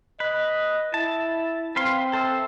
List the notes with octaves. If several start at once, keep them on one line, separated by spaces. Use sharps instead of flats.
B4 D#5
E4 A5
C4 B4 F5 C6
A4 C5 E5